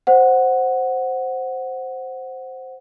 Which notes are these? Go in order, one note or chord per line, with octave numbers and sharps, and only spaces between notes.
C5 F#5